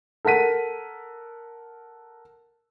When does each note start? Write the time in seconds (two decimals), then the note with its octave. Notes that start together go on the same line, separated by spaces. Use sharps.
0.25 A4 A#4 F#5 B6 D#7